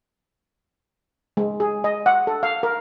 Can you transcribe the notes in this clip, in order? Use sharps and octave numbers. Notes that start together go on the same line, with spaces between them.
G#3
G#4
D#5
F#5
A4
F5
A#4